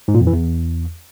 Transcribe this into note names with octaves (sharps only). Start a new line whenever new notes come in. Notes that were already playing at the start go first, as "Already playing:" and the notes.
G#2
A#2
F2
E3
E2